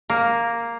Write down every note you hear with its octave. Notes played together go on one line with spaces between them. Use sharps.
A#3